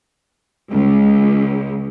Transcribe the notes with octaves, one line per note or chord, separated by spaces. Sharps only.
C#2